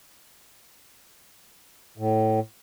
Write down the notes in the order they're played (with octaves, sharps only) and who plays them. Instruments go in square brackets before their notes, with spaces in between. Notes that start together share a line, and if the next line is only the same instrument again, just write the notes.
[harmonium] A2